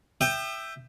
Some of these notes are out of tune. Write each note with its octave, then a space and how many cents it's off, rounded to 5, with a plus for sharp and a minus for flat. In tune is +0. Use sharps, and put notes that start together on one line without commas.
E5 +10 G5 +0 D#6 -40